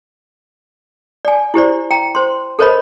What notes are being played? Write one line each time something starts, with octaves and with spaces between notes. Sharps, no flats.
D5 G#5
E4 G4 C5 D5
G5 A#5
C5 C6
A4 A#4 C5 C#5 D#5 B5